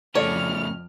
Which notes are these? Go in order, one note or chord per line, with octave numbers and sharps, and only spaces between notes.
F2 A2 C#3 A4 C#5 D5 F6